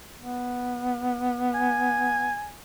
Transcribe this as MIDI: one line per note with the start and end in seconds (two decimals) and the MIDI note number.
0.20 2.38 59
1.54 2.52 80